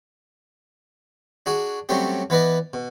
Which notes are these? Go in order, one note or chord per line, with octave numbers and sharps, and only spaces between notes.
D4 F#4 G#4
F#3 G3 A3 C4 C#4 G4
E3 B3 B4 D5 D#5
B2